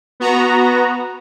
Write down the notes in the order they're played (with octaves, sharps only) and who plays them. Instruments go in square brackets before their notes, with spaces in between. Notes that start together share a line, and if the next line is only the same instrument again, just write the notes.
[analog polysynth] B3 F#4 A#5